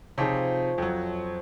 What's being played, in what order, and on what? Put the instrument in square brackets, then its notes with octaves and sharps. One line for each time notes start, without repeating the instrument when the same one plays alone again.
[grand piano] C3 D#4 G#4 [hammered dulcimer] F3 C#5
[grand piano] F2 F#3